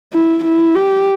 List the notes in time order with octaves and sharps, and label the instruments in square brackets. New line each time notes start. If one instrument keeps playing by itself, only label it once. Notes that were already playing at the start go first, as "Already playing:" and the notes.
[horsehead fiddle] E4
E4
G4